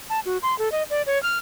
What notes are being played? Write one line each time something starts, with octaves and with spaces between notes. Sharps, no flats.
A5
F#4
C6
A4
D#5
D5
C#5
F6